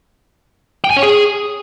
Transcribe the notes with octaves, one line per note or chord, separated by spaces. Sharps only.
G5
G#5
C#5
G#4